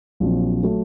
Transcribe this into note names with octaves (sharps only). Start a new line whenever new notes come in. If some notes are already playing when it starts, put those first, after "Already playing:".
A#1 A#2 F#3 C4
F#3 A3